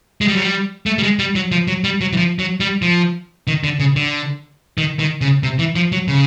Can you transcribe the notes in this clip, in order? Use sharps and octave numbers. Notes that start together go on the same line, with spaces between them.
G#3
G3
F#3
G3
A3
G3
G#3
G3
F#3
F3
F#3
G3
F#3
E3
F3
F#3
G3
F3
D#3
D3
C#3
D3
D#3
D#3
C#3
C3
E3
F3
F#3
C#3